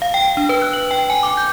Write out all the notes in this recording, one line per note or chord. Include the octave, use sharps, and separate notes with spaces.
F5
G5
D4
B4
F#6
F#7
G5
G#5
D6
G6